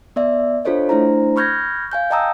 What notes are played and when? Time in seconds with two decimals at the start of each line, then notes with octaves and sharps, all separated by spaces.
0.16 B3 D5 E5
0.65 D4 F4 A4 C5 C#5 D#5
0.89 A3 D4 E4 C5 A#5
1.36 B5 C#6 F6 G6 G#6 A#6
1.91 F5 G#5 G6
2.11 D#5 G5 A5 A#5 D#6 E6